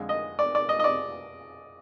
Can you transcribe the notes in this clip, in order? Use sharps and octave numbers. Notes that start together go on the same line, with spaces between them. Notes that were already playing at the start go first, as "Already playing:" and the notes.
Already playing: F2 D3 G#3
D#5
D5
D5
D#5
D#5
D5